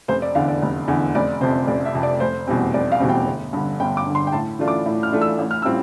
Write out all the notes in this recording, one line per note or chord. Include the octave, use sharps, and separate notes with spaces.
F1 C5
D5
E2 D3 F5
D5
F1
E2 D3
F1 D5
F2 C3 C5
F1 D5
E5
F2 C3
D5
F1 C5
E2 B2 G3 C4
F1 D5
F5
E2 B2 G3 C4
G5
G1
G2 D3
G1 G5
D6
G2 D3
C6
G5
A2 A5
E3 A3 D4 F4
D6
A2
F6
E3 A3 D4 F4
E6
A1
F6
A2 G3 C4 F4 E6